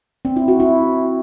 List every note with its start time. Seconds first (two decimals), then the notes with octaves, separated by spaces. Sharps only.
0.25 C4
0.36 E4
0.48 F#4
0.60 E4